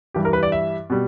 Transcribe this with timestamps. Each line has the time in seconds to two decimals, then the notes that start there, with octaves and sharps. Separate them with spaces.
0.14 G2 E3 G3 G4
0.25 A#4
0.33 B4
0.43 D5
0.52 E5
0.90 B2 G3